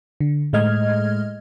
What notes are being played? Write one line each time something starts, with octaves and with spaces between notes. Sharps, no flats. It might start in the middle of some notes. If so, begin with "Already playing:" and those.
D3
A2 G#3 A3 D#5 F6 G#6